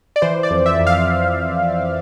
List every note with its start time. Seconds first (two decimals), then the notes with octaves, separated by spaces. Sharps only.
0.16 D5
0.22 E3 C5
0.43 D5
0.51 F2
0.66 E5
0.80 F2
0.87 F5